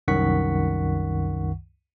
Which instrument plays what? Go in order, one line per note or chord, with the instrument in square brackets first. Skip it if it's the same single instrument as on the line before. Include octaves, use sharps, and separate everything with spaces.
[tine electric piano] C2 F#2 D#3 F#5 C#6 B6